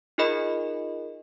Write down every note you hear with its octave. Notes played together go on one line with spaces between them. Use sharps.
D#4 F4 G#4 A#4 D#5 B5